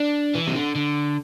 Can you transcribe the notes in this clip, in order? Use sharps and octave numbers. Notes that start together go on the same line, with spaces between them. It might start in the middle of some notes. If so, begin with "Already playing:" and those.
Already playing: D4
E3
C3
D3
D3